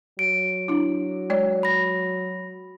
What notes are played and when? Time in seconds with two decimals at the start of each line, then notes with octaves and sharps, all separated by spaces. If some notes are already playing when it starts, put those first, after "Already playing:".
0.19 F#3 D7
0.68 D4 E4
1.30 G#3 C#5 D5
1.63 B5 A#6